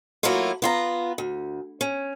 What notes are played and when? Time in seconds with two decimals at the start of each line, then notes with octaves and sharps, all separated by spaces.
0.23 F#3 A3 A#3 E4 F4
0.62 B3 F4 A#5
1.18 D2
1.81 C#4